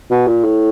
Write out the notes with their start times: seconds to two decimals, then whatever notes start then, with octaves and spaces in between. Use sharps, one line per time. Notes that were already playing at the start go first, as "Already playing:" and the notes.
0.11 B2
0.27 A#2
0.44 A2